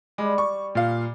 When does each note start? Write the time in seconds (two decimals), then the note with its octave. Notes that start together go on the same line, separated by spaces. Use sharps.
0.18 G3 G#3
0.38 C#6
0.75 A#2 F5